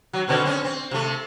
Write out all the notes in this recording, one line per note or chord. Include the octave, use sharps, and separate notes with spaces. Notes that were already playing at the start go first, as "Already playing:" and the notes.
F#3
B2 D3 C4
C4 C#4
C4
C3 A3